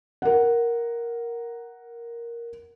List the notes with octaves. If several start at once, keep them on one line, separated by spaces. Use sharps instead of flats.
A#4 F#5